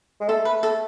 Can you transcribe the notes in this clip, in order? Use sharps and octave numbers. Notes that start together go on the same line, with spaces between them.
G#3
A3 A4
B4
A4